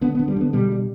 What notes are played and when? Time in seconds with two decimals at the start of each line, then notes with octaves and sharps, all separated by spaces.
0.01 D3 B3
0.15 D3 B3
0.28 G3
0.36 D3 B3
0.53 B2 G3
0.72 G3